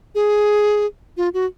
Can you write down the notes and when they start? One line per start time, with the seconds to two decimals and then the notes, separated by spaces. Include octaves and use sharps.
0.15 G#4
1.17 F4
1.34 F#4